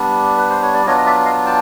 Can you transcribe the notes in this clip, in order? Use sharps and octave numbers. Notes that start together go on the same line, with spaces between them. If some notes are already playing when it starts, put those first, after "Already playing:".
Already playing: G3 B3 D4
B4
C5
C#5
D5
F#3 B3 D4 F4 C#5 D#5
D#5
D5 E5
D#5 F5
G5 A5